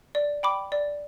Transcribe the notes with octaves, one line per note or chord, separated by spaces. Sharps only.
D5
G5 B5 D6
D5